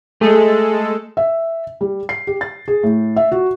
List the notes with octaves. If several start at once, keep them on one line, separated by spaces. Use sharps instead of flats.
G#3 A3 G#4 A4
E5
G3
C7
G4
A6
G#4
A2
E5
F#4